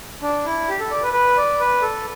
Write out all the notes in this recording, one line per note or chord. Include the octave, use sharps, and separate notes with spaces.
D4
E4
G4
A4
D5
B4
B4
D5
B4
A4